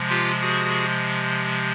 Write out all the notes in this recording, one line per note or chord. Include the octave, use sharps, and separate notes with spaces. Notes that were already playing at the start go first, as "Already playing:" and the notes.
Already playing: C3 F3 G#3
F4 G4
F#4 G#4